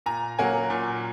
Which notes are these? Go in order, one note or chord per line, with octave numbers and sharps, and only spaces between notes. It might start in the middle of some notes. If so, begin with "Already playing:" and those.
A#2 G#5 A#5
F#3 A#3 C#4 F#5 G#5
A#2